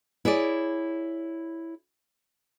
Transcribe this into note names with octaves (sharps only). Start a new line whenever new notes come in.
E4 G#4 C#5 D5